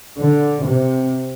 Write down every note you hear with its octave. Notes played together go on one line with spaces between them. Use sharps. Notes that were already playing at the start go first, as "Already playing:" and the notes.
D3
C3